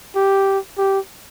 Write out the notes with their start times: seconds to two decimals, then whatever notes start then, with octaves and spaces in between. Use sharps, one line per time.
0.16 G4
0.77 G4